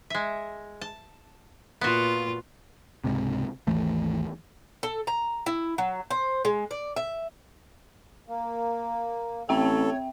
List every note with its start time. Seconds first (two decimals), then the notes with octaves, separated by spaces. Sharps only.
0.10 G#3 E5
0.81 A5
1.81 A#2 B3 F4 F#4
3.04 C#2 G#2 C3
3.67 G#1 D#2 E3 A3
4.83 A4
5.07 A#5
5.46 E4
5.78 F#3
6.10 C5
6.45 G#3
6.71 D5
6.96 E5
8.28 A#3
9.49 A1 C4 A4 C#5 E5 G5